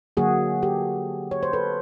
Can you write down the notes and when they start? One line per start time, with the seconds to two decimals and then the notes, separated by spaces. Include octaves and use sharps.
0.17 D3 F#3 A#3 F#4 G#4
0.63 G4 A4
1.31 C#5
1.43 C5
1.53 A4 B4